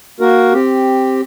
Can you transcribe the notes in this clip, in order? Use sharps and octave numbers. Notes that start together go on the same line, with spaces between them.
A#3 F#4 A#4
C4 G4